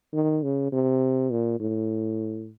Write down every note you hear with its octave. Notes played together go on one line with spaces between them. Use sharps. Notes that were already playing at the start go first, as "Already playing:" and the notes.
D#3
C#3
C3
A#2
A2